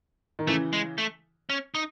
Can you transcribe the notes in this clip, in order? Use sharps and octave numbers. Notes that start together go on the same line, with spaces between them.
D#3
C#3 E3 A3
G#3
A3
C#4
D#4